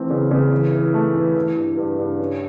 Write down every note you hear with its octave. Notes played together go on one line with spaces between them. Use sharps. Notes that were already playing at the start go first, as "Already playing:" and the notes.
Already playing: E3 A3 C4
C#3
C#3
E3
E3
A3
E3
E3
G2
G2
G2
C#4